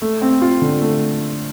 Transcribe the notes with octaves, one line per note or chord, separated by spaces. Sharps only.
A3
C4
F4
D3
A3